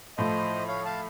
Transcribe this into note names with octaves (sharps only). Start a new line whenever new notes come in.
A2 F3 A3 C5 D#5
C#5 F5
F5 A5